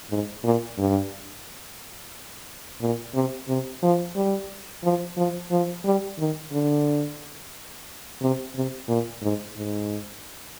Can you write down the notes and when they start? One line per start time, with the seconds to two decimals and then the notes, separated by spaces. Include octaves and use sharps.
0.10 G#2
0.44 A#2
0.78 G2
2.81 A#2
3.14 C3
3.48 C3
3.83 F3
4.16 G3
4.83 F3
5.17 F3
5.51 F3
5.85 G3
6.18 D#3
6.52 D3
8.21 C3
8.55 C3
8.88 A#2
9.22 G#2
9.57 G#2